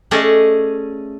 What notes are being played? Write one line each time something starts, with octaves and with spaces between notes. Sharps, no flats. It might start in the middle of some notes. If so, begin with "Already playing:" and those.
A3 C#4 G#4 D5 D#5